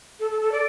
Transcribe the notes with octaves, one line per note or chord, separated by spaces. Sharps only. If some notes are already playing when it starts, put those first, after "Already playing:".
A4
A4
A4
D5